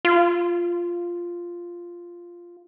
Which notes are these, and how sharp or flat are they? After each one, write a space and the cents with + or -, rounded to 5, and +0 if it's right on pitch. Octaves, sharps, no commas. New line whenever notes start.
F4 -5